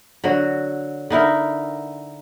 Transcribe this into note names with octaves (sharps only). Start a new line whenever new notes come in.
D3 F#3 F#4
D3 D#4 E4 A#4